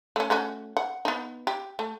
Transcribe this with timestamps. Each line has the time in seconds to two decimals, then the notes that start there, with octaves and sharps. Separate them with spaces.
0.16 A3 C#4
0.30 A3 C#4 F#4
0.77 F#5
1.05 B3 D#4
1.47 G4
1.79 A3